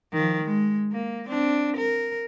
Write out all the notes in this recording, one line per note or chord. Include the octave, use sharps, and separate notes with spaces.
D#3 F3
G#3
A#3
C4 D4
A#4